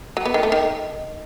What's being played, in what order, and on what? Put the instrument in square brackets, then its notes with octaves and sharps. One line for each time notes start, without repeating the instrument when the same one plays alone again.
[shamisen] F#3
B3
D#3
A3
D#3